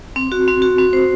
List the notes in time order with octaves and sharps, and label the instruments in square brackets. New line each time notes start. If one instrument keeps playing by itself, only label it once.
[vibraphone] C4
F#4
C4
F#4
C4
C5